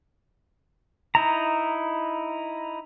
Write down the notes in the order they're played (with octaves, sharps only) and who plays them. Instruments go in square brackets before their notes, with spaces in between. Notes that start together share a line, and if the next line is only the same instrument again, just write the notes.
[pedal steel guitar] D#4 E4 A#5